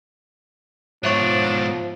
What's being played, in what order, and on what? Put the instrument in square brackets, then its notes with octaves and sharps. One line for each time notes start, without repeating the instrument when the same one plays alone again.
[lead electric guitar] G#2 B2 [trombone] F3 [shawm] D4 [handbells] C#5 E5 C#6